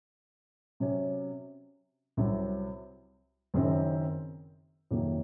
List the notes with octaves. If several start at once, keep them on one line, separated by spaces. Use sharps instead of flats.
C3 F#3 C#4
C2 C3 F#3 C4
F#1 F#2 D#3 F#3 C4
F2 C3 D#3 F#3 A#3